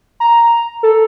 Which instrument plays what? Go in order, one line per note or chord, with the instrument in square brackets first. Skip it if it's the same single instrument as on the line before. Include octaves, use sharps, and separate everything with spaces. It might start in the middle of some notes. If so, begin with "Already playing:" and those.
[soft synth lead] A#5
A4